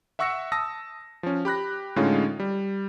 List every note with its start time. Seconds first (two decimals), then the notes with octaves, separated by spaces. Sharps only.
0.19 E5 F#5 C#6 E6 A#6 C#7
0.52 A5 D#6 E6 A#6
1.23 F3 C#4
1.45 G4 B5 F#6 A#6
1.96 A2 D3 G#3 C#4 D#4 F4
2.40 G3